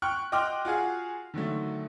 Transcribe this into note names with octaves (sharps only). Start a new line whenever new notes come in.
G5 C#6 F6 F#6
D#5 G5 C6 D6 F6 F#6
F4 F#4 G#4 F5
D3 D#3 F#3 A3